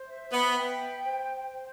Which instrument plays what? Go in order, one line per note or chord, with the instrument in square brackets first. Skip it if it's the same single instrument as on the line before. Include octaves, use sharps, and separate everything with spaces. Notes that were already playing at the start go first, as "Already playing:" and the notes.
Already playing: [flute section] C5
E5
[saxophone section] B3
[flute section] G5
C5
C5